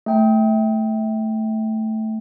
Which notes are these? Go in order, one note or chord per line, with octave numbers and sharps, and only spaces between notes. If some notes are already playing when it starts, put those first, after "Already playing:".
A3 G5